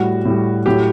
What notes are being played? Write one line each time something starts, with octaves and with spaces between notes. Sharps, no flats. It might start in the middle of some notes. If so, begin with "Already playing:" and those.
Already playing: A2 G3 F#4
A2 G3
A2 F#3 G4